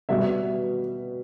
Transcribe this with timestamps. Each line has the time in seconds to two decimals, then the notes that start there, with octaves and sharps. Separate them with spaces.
0.09 B2 G3 E5